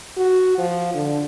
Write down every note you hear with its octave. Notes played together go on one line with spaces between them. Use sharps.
F#4
F3
D3